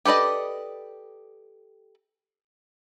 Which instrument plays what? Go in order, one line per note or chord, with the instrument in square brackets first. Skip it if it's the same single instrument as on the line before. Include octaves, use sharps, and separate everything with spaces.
[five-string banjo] G4 A4 B4 D5 D#5